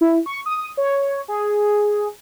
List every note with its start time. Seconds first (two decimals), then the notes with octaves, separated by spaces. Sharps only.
0.01 E4
0.26 C#6
0.46 D#6
0.77 C#5
1.28 G#4